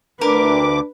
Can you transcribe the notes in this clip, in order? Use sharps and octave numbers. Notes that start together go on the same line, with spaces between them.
D2 D4 A#4 B4 D6